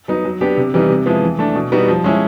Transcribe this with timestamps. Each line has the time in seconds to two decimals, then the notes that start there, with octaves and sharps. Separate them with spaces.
0.08 F#3 B3 D#4
0.25 F#3
0.41 B3 D4 G4
0.57 C3
0.74 E3 G3 B3 D#4
0.89 C3
1.06 F3 G#3 B3 E4
1.22 E3
1.39 A3 D4
1.55 B2
1.72 G3 B3 D#4 F#4
1.88 F3
2.04 G#3 C#4 E4